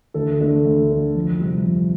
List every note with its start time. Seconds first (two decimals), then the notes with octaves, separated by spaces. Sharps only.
0.14 D2 A4
0.40 D3 A3
0.65 D2
0.90 D3 A3
1.15 F2
1.40 C3 G3
1.65 F2